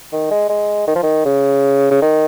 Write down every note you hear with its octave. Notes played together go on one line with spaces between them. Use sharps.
D#3
G#3
G#3
D#3
F3
D#3
C#3
C#3
D#3